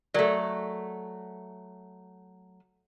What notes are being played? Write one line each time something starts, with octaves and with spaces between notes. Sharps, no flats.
F#3 A3 A#4 D5